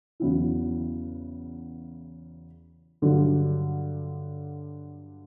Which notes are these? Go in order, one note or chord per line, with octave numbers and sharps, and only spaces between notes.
E2 C#3 F#3 B3 E4
G2 D3 F#3